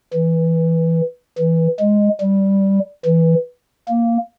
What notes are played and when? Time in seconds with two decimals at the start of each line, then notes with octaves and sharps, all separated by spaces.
0.13 E3
1.38 E3
1.80 G#3
2.21 G3
3.05 E3
3.88 A#3